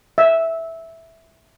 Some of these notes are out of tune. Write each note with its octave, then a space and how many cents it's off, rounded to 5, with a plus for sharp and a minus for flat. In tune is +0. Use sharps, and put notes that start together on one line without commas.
E5 -5